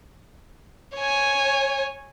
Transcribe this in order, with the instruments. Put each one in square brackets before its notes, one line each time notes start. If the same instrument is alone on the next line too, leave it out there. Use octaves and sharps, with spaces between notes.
[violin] C#5 G#5